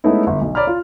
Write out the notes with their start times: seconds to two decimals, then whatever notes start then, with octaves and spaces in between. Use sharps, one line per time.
0.04 G#3 A3 B3 C#4 D#4 E4
0.27 G1
0.41 B1
0.55 C#5 D5 A#5 B5 F6
0.67 F4